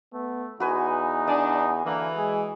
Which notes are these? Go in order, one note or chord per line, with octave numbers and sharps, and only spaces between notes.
A3 B3
E2 D#4 F#4 B4 G#5
D4 D#5 G#5
D3 E3 A#3
G#3 G#4